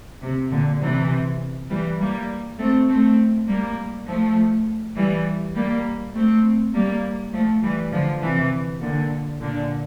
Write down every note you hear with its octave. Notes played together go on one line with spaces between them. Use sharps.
C3
A#2 D3
C3 E3
E3 G3
G3 A#3
A3 C4
A3 C4
G3 A#3
F3 A3
E3 G3
G3 A#3
A3 C4
G3 A#3
F3 A3
E3 G3
D3 F3
C3 E3
A#2 D3
A#2 D3